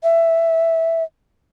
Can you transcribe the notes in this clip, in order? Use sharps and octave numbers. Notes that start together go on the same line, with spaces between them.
E5